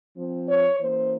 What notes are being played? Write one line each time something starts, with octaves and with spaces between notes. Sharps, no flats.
F3 C4
C#5
E3 A#3 C#4 C5